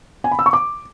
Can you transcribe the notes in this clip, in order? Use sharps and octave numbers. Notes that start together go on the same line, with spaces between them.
G#5
B5
E6
C#6
D6